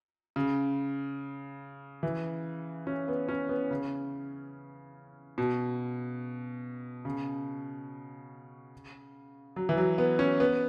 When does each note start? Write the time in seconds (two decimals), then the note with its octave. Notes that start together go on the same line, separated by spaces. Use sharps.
0.36 C#3
2.03 E3
2.87 C#4
3.08 B3
3.28 C#4
3.49 B3
3.71 C#3
5.38 B2
7.05 C#3
9.56 F#3
9.69 E3
9.77 F#3
9.98 B3
10.19 C#4
10.40 B3